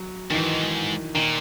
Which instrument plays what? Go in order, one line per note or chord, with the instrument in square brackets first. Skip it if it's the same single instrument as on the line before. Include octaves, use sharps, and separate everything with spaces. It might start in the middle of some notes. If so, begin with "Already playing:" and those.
Already playing: [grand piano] F#3
[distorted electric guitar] A#2 [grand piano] D#3
[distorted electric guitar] G#2 [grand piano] E3
[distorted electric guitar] A#2 [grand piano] D#3